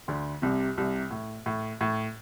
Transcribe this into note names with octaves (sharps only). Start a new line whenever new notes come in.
D2 D3
C2 C3
C2 C3
A2
A2
A2